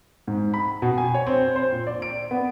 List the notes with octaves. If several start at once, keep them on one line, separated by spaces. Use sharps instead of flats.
G#2
B5
B2
G#5
C#5
C4
C5
A#2
D5
D7
B3